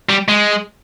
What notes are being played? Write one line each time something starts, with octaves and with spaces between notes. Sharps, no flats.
G3
G#3